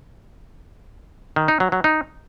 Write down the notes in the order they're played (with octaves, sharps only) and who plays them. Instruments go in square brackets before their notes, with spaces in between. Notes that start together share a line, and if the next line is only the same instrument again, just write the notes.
[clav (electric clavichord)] D#3
D#4
F#3
F#3
D#4